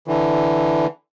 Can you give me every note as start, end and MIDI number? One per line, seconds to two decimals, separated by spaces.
0.07 0.86 50
0.07 0.86 52